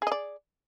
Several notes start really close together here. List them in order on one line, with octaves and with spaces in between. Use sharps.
G#4 D#5 D5